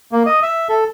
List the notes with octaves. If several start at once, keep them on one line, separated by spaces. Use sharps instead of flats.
A#3
D#5
E5
A4